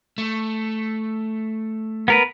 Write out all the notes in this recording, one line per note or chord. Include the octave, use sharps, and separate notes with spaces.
A3
B3 A#4 B4